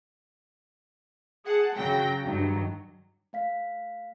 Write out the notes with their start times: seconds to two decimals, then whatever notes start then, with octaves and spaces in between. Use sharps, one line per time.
1.45 G#4 F#5 A5
1.76 C#3 F#3 G5 A#6
2.25 G2 D#3 F#3
3.33 A3 F5 B6